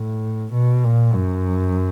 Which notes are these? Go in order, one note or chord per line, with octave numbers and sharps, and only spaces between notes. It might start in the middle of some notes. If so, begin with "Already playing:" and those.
Already playing: A2
B2
A#2
F#2